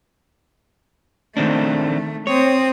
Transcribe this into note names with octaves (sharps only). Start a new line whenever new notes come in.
D#3 A3 C4 D4
C4 C#5 D#6